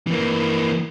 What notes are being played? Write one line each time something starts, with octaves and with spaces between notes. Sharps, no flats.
E3 A#3